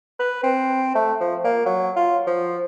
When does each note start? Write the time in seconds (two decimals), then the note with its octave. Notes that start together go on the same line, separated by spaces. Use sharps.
0.20 B4
0.43 C4
0.95 A3
1.21 F3
1.44 A#3
1.66 F#3
1.96 F4
2.27 F3